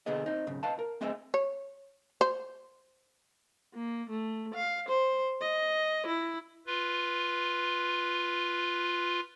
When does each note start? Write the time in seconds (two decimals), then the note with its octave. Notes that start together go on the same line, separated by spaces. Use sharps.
0.06 B2 D3 B3 G#4 D#5
0.26 C4 D#4
0.47 B1 G#2 C#3
0.63 B4 D#5 F5 A5
0.79 A#4
1.01 A3 C4 G#4 D#5 E5 G#5
1.34 C#5
2.21 C5
3.74 A#3
4.10 A3
4.54 F5
4.89 C5
5.41 D#5
6.07 E4
6.66 F4 B4